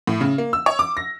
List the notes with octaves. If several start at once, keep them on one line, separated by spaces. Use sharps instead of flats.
A2
C#3
A#3
E6
C#5
D6
A#6